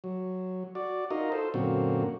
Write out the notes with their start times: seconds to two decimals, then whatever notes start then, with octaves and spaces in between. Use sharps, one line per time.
0.04 F#3
0.75 F#4 D5
1.11 D#4 F4 F#4 A#4 D#5
1.32 A4 C5
1.54 F#2 A#2 D3 A#3 C4 F#4